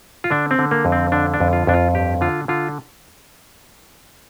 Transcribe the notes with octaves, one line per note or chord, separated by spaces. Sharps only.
F4
D3 D4
C4
D3
A#3
F2
C4
D3 D4
D4
F2
F4
F2 D4
F4
G2 G4
D3 F4
D3 F4